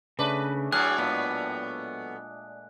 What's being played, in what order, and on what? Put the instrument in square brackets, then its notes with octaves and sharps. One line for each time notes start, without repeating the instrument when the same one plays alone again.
[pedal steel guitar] C#3 [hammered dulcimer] A3 D4 [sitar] B4
[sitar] A2 F#3 [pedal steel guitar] G#4 F6 [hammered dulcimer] A5 D6 [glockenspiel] F#6
[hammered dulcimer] A#2 G#3 [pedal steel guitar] B3